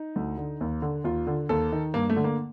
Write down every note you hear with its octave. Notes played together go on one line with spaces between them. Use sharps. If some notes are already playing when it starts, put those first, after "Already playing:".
Already playing: D#4
D2
D3
D#2
D3
D#2 F4
D3
D#2 A4
D#3
G2 A#3
A3
D3
A#3